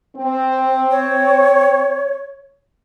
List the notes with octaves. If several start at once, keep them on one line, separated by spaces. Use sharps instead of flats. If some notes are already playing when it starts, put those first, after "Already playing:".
C4
C#5